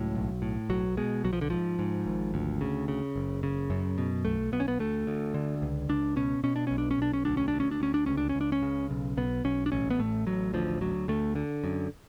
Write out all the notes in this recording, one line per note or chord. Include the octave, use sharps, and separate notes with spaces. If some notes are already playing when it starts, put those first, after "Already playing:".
Already playing: C#2 A2 F#3
B1
A2
B1 F#3
B2 G#3
B1 F#3
F3
D3
G#2 F3
G#2
G#1
D2
C#3
C#3
F#1
C#3
F#2
B2
B1 A3
B1 B3
C#4
B3
D2 A3
D2
D3
C#2
C#2 D4
B2 C#4
B2 C#4
D4
B1 C#4
D4
C#4
B1 D4
C#4
D2 D4
C#4
D4
D2
C#4
D4
D2 C#4
D4
C#2 C#4
D4
C#4
C#2
D4
C#4
C#3
B1
B1 B3
B1 C#4
D4
A1 C#4
B3
A2 A3
A1 F#3
D2 F3
D2 F#3
D2 A3
D3
F#2